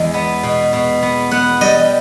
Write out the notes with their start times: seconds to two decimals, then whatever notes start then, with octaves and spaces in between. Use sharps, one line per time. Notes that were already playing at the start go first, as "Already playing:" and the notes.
Already playing: E2 G#3
0.14 B3
0.43 B2
0.73 B2
1.03 B3
1.31 B3 F#5
1.61 G3 D#5